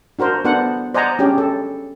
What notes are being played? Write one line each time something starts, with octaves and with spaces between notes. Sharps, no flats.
D4 F#4 A#4 C5
B3 D4 A4 C5 F#5
C5 D5 D#5 F#5 G#5 A#5
C#4 D4 G4 G#4
A4